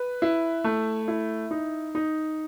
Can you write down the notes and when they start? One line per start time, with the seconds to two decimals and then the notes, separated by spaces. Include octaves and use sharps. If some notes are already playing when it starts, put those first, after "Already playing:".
Already playing: B4
0.22 E4
0.64 A3
1.08 E4
1.51 D#4
1.95 D#4